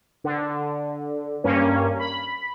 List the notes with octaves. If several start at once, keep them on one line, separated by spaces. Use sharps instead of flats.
D3
G2 A#3 C#4
B5